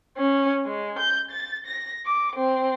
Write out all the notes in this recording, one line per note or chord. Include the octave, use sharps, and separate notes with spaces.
C#4
G#3
G6
A6
A#6
D6
C4